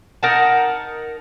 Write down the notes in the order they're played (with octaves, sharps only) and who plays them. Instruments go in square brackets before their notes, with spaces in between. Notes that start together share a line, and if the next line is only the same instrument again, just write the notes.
[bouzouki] D#4 A#4 F#5 A5